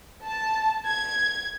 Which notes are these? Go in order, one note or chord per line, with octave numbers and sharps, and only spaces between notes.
A5
G#6